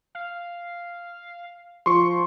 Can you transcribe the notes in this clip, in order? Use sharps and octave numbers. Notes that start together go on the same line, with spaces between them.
F5
F3 C6 C#6